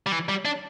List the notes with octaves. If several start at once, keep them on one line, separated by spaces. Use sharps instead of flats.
G3
E3
G3
D4